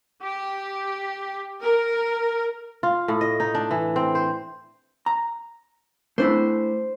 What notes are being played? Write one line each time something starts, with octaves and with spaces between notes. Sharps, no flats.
G4
A#4
F4
A2
D#5
D#4
D4
E3
C4
C5
A#5
A3 D4 E4 C5